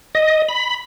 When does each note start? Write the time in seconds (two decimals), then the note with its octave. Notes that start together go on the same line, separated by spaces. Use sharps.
0.15 D#5
0.49 B5